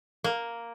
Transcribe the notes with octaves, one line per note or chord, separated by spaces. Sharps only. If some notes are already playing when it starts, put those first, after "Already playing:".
A#3